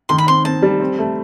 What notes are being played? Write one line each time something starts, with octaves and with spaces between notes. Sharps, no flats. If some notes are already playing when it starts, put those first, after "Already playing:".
D#3 C6
B5
C4 C6
C4 A5
G3
C4
A3